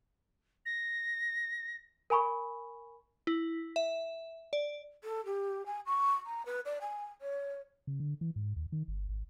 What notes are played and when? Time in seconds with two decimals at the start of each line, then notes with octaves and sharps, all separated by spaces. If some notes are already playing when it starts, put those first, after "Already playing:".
0.66 A#6
2.10 A#4 G#5 B5 C#6
3.27 E4
3.76 E5
4.53 D5
5.04 A4
5.25 G4
5.66 G#5
5.86 C#6
6.26 A#5
6.46 B4
6.65 D5
6.81 G#5
7.21 C#5
7.87 C#3
8.00 D3
8.21 E3
8.36 G#2
8.56 D#2
8.72 D#3
8.88 G1
9.09 G#1